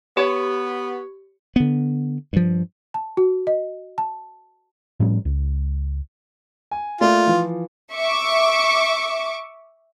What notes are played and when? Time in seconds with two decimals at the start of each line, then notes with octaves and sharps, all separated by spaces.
0.17 B3 G4 C#5
1.56 D3 B3
2.33 G2 F3
2.94 A5
3.17 F#4
3.47 D#5
3.98 A5
5.00 A2 F3 G3 C#4
5.25 C#2
6.71 G#5
7.01 A3 A#3 F4 D5
7.27 E3 F3
7.93 E5 C#6 D6